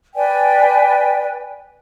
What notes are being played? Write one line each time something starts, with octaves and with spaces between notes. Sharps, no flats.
B4 D5 G5 G#5